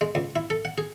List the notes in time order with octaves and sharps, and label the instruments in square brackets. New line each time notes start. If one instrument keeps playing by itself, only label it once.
[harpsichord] G#3
C#2
E4
A4
F#5
G#4